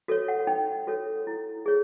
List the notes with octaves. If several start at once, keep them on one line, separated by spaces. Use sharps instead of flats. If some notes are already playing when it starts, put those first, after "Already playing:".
F#4 A4 C#5
F#5
D#4 G5
F#4 A4 C#5
E4
G#4 C#5